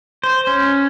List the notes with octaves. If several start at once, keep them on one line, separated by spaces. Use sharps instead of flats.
C5
C#4